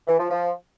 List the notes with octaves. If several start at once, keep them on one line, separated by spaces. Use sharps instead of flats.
E3
F3
F3